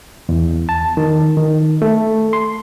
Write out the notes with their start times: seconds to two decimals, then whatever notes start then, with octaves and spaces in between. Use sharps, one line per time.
0.29 E2
0.69 A5
0.97 D#3
1.37 D#3
1.82 A3
2.33 C6